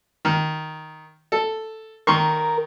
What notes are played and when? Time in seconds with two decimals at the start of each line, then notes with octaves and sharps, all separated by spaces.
0.25 D#3
1.32 A4
2.07 D#3 A#4 C6 C#6